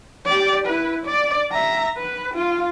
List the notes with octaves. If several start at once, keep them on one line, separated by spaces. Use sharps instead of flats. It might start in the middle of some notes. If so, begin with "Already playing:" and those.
G4 D5
E4 B4
D5
E5 A#5
B4
F4